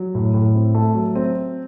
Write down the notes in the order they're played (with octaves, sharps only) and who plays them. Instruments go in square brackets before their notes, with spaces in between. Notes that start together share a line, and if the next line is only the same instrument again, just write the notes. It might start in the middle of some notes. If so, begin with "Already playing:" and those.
Already playing: [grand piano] F#3
A2
A2
C4
A3
F#3
C4